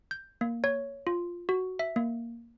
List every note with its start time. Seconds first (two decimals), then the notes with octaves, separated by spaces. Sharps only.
0.11 G6
0.41 A#3
0.64 C#5
1.07 F4
1.49 F#4
1.79 E5
1.96 A#3